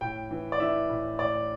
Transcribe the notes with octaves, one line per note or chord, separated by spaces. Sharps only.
A2 G5
E3
D5
E3 E5
A2
A2 D5